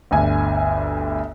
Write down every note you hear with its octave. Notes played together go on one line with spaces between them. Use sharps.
G1 D2 G#5